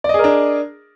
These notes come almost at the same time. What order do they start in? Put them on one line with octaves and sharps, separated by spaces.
D5 D#5 G#4 A#4 D4